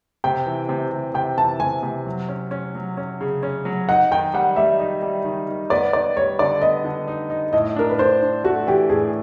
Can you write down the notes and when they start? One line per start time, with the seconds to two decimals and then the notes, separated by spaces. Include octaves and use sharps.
0.24 C3 G5
0.46 E3
0.69 C3
0.92 C3
1.14 C3 G5
1.38 E3 A5
1.60 C3 G#5
1.83 C3
2.06 F#3
2.29 C#4
2.51 C#4
2.75 F#3
2.97 C#4
3.21 C#3
3.43 C#4
3.65 F#3
3.89 D#4 F#5
4.11 D#3 G5
4.34 G3 F#5
4.56 G3 E5
4.79 D#4
5.02 G3
5.25 D#3
5.48 D#3
5.70 B3 D5
5.93 D#4 D5
6.17 G3 C#5
6.39 D3 D5
6.61 B3 D#5
6.84 D3
7.08 D#4
7.30 D#4
7.53 A2 D#5
7.76 D4 A#4
7.90 B4
7.98 D4 C5
8.22 D4
8.44 A3 F#4
8.67 E3 G4
8.89 A2 G#4